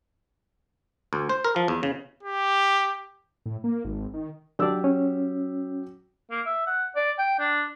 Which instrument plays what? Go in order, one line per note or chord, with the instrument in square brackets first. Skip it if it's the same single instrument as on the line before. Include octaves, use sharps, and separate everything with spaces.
[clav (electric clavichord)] D2
C5
A#4
F3
E2
C#3
[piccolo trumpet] G4
[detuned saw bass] A2
A#3
G#1
D#3
[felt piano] F#3 G4 E6 [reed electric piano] D4 D5
[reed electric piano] C#4
[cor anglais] A#3
E5
F#5
D5
G5
D4